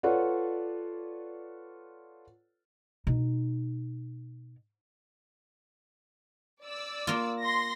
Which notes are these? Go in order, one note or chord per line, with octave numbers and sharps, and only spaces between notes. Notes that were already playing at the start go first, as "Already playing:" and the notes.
F4 A4 B4 C#5 D5 F#5
B2 D#4
D5 E6
A#3 F4
C6 A#6